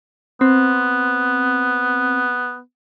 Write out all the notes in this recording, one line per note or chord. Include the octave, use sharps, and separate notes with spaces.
B3 C4